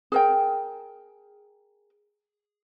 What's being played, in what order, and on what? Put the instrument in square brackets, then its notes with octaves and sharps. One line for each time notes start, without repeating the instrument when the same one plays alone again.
[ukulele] G#4 A#4 G5